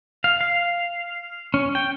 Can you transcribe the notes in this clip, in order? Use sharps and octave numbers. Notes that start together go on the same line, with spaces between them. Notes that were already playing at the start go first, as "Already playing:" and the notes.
F5
F5
C#4
G5